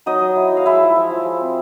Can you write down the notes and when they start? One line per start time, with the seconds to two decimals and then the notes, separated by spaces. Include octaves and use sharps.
0.06 F#3 D#4 D#5
0.21 F#3
0.36 E4
0.52 F#3 F5
0.66 G#3 E4 E5
0.82 F3
0.96 F3
1.11 F3
1.25 G#3
1.40 C4